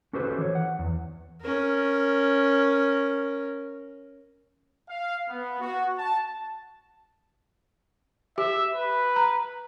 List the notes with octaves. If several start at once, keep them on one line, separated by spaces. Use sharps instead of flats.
C#4 F#4 G4 A4 B4 C5
E3 C#5
F#5
E2
C#4 A#4
F5
B3
F#4
A5
G4 E5
B4
A#5